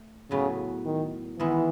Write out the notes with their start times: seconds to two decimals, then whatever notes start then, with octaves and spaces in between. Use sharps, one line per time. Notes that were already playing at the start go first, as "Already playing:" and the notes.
Already playing: A3
0.31 A2 C#3 F#3 B3
0.85 D#3
1.39 D#3 E3 G#3 B3 E4